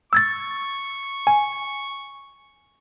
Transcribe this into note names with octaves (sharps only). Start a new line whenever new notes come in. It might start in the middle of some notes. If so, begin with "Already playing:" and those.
C#6 E6 G#6 A6
G#5